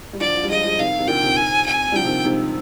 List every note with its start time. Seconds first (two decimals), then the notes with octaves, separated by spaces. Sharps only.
0.13 G3
0.20 D3 F3 D5
0.35 D3 F3
0.44 G3
0.49 F3 G#3 D#5
0.64 F3 G#3
0.78 C3 D#3 F5
0.99 C3 D#3
1.08 A#2 D3 G5
1.22 C3 D#3
1.37 G#5
1.66 G#5
1.92 G3
1.95 D3 F3 G5
2.05 C3 D#3
2.25 G#2 C3